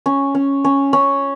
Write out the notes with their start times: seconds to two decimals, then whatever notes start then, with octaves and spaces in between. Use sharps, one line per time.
0.06 C#4
0.35 C#4
0.65 C#4
0.93 C#4